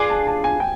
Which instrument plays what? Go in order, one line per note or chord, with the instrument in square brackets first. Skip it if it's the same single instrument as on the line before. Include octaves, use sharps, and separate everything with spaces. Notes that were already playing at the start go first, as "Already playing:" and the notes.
Already playing: [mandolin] D4 F4 G#4 B4 [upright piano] G#5
[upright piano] A5
A5
G#5
G5